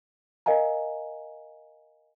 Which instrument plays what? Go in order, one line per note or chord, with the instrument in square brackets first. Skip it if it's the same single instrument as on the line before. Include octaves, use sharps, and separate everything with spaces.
[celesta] A#4 D#5 F5 G#5 A#5